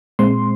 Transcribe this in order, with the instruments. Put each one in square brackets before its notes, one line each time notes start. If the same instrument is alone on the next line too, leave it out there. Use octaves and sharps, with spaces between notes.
[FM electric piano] A#2 G#3 C4 C6